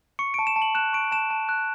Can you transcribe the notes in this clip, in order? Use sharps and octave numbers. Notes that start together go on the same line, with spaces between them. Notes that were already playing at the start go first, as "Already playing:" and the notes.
C#6 C#7
A5 D7
E7
A5
F#7
F#6 E7
C#6 D7
A5 E7
A5
F#6